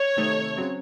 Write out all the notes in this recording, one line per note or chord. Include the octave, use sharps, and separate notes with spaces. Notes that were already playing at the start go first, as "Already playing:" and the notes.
Already playing: C#5
C3 D#3 A3 D#4 A4
C#3 F#3 C4